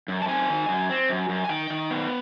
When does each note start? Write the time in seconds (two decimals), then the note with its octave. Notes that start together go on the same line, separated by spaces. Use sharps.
0.08 F#2
0.22 A5
0.28 C4 G#5
0.50 D#3
0.69 F#2
0.90 C4
1.09 F#2
1.29 F#2
1.44 G#5
1.49 D#3 G5
1.70 D#3
1.91 B3